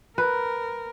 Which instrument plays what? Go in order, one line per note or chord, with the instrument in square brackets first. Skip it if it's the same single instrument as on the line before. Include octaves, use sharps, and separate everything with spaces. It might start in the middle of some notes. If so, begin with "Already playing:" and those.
[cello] A#4 [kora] B4